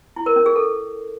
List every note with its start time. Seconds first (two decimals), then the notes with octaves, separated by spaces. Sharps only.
0.16 E4
0.26 A#4
0.36 C#4
0.46 G#4
0.56 A4